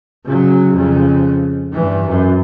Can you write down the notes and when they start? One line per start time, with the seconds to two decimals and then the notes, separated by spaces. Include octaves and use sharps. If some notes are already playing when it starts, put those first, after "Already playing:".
0.25 C#3 F#3
0.73 F2 C#3
1.73 G2 E3
2.07 F#2